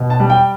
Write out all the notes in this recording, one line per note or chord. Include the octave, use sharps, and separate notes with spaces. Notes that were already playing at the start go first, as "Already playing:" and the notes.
Already playing: B2
A5
G3
G5